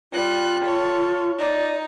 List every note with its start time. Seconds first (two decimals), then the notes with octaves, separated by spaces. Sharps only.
0.13 G3 F4 F#6
0.65 A4 C#5
1.38 D#4 D5